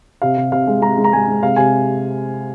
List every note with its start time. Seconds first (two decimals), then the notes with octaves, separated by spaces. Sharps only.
0.22 C3 F5
0.37 C3
0.52 C3 F5
0.67 G#3
0.82 G#3 A#5
0.98 G#3
1.04 A#5
1.13 G#3 G#5
1.28 G#3
1.43 C3 F5
1.56 C3 G#5